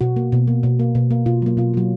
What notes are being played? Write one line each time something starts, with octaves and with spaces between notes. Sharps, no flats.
B2 F#4
A#3
B2
A#3
B2
A#3
B2
A#3
B2 F4
F#3 A#3
B2 F4
F#3 A#3